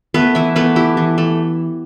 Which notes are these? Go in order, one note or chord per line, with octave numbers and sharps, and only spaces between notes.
A3 B3 B4
E3 E4 E5
A3 B3 B4
E4 G4
E3
A3